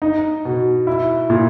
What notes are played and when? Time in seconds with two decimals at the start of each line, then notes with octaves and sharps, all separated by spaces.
0.02 D#4
0.45 B2
0.87 E4
1.30 A#2